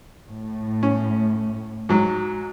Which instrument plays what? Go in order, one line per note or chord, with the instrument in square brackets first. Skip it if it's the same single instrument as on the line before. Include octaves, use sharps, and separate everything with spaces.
[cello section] A2
[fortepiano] C#4
G#2 F#3